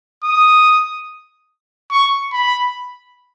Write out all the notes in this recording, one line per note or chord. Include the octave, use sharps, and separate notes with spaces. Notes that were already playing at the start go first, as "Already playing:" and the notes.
D#6
C#6
B5